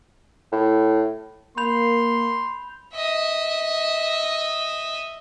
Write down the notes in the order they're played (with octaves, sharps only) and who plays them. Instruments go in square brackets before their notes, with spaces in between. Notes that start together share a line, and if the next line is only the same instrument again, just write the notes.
[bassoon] A2
[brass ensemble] A#3 [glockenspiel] B5 G6 F7 [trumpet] C6
[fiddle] D#5 E5